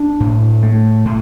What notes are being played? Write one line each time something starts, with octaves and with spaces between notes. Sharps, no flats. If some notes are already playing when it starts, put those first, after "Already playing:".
Already playing: D4
A2
A3
A2